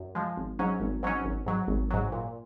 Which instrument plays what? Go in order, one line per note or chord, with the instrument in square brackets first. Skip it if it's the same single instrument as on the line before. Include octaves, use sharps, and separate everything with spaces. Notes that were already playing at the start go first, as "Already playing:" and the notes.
Already playing: [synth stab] F#2
F3 G#3
G#1
G#2 F#3 C#4
G#1
G#2 F#3 C#4
G#1
G#2 F#3
G#1
G#2 F#3
A#2